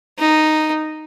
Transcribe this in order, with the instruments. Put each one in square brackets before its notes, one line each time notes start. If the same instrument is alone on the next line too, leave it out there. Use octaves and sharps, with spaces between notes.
[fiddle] D#4